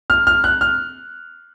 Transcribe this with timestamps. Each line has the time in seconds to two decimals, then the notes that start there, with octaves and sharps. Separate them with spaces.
0.10 F6
0.27 F6
0.44 F#6
0.61 F6